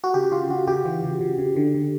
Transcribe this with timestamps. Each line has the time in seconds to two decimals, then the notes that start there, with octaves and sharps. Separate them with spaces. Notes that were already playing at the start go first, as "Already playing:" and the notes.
0.04 F#4
0.14 C#3 G4
0.31 C#3 F4
0.50 C#3 F#4
0.67 C#3 G4
0.85 E3
1.03 C#3
1.21 C#3
1.38 C#3
1.56 D3
1.75 D3